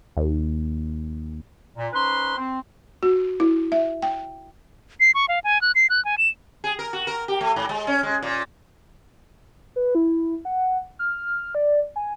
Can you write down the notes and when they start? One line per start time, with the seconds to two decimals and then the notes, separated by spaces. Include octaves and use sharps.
0.17 D#2
1.77 A#2
1.93 C#4 D#4 B4 C5 C6
2.37 C4
3.03 F#4
3.40 E4
3.72 E5
4.02 G5
5.00 C7
5.15 C#6
5.29 F5
5.44 G#5
5.62 F#6
5.75 C7
5.90 F#6
6.05 G#5
6.18 E7
6.64 G#4
6.79 A#4
6.93 F#4
7.07 A#4
7.28 G4
7.41 A3
7.56 G#2
7.69 G#3
7.87 C#4
8.03 G#3
8.23 A#2
9.76 B4
9.95 E4
10.45 F#5
10.99 F6
11.55 D5
11.96 G#5